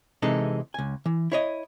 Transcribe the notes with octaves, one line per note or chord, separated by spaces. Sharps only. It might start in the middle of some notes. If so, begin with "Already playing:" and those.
C3 E3 G#3 D#4 A4
C#2 G#5
E3
E4 C#5 D#5